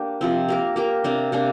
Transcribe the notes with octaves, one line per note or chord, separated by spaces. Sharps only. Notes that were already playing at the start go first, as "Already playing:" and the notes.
Already playing: A#3 D4 G4
C3 F3 C4
A#3 G4 A#4
A#3 G4 A#4
C3 A#3 D4
C3 A#3 D4